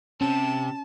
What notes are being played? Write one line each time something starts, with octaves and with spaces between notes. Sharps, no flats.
C3 C4 C#4 A5